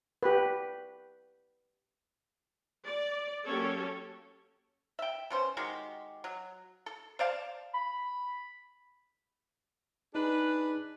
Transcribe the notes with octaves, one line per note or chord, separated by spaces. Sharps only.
G4 B4
D5
F#3 A#3 C#4 G4 A4 C#5
E5 G5
B2 C#4 C5
D#3 G#3 F#4 G4
F#3
A4
C5 D5 F5 A5
B5
D4 D#4 G#4 B4